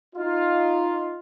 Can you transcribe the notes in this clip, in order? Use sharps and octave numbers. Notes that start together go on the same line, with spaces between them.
D#4 F4